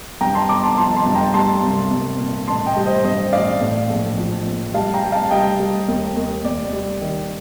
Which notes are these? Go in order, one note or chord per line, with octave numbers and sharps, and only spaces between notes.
G2 G5 A#5
A5 C6
G1 A#5 D6
A5 C6
F3 A5 C6
A5 C6
G2
G5 A#5
G3 A5 C6
C2
C2
A#2
A1 A5 C6
D#5 G5
G3
C5 D#5
G2 C5 D#5
A1 D5 F5
A2
A#1
F3
A#1
G3 F5 A5
G5 A#5
G3
F5 A5
G3 D#5 G5
G3
D#2
D#2
D#2 D5
G3
D#3